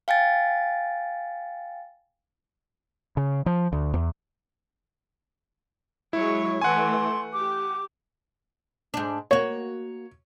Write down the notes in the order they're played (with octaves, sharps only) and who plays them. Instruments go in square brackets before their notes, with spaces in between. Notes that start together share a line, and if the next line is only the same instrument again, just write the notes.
[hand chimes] F5 G5 G#5 A6
[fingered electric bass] C#3
F3
D2
E2
[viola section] F#3 G#3 C#5 [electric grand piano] E4
[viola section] E3 A3 [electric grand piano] F#5 G#5 [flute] C6
[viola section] G4 [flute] D6
[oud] G#2 D4
[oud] A#3 F#4 [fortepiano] C#5